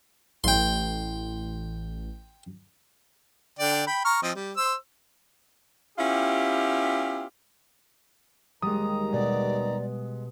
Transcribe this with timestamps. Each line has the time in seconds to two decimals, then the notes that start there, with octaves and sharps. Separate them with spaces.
0.44 A1 G5 C6
3.59 D3 D5 G5
3.87 G5 B5
4.05 A#5 C#6 F6
4.23 F3 C4 D#5
4.36 G3
4.57 C5 E6
5.99 B3 C#4 E4 F4 G4
8.62 D#2 D#3 G3 G#3 A#5 D#6
9.13 B2 D5